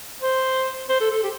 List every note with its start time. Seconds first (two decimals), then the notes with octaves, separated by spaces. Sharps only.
0.22 C5
0.89 C5
1.00 A4
1.11 A4
1.23 G4